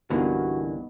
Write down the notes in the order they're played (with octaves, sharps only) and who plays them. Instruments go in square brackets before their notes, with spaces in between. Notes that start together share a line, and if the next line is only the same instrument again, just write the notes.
[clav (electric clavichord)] C2 G2 [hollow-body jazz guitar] D3 E3 A#3 [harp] B3 D#4 [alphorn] F#4